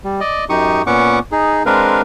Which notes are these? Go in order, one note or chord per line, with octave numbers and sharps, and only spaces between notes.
G3
D5 D#5
F#2 D#4 G4 C#6 D#6
A#2 B3 C#4 F#5 C#6 D6
D#4 G#4
G#3 C4 D4 A#4 B4 F5